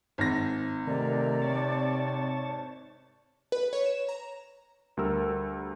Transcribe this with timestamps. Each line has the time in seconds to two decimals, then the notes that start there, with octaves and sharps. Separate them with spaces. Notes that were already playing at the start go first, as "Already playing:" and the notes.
0.18 G#1 A#6
0.87 C3 D#3 A3 A#4 D5
1.42 C#5 A5
3.52 B4
3.73 C#5
3.86 E7
4.09 A#5
4.97 D2 G3 A#4 E6